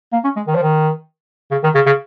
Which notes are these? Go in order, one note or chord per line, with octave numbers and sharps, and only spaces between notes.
A#3
C#4
G#3
D#3
F3
D#3
C#3
D#3
C#3
C#3